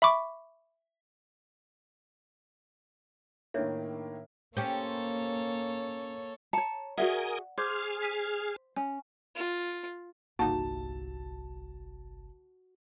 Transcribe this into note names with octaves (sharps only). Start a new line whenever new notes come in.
E5 B5 C#6 D6
A2 D#3 A#3 D4 C#5 E5
A#3 C#4 G4 A4 C5 C#5
C#5 A5 A#5 C#7
F#4 G#4 A#4 D5 E5 F#5 G#5 D#6
G#4 C5 C6 D6 F6 G#6
B6 D#7
C#4 G#5
F4
G1 C2 A#3 D#4 F#4 A5